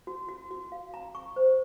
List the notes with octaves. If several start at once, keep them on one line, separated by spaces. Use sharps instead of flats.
F#4
F#4
F#4
F5
A#5
C#6
C5